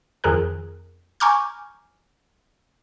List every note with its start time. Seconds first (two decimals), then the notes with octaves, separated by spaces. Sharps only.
0.24 F2 D#3 G#4 A#4 F#6
1.20 G#5 A#5 C#6 D6 F6 G6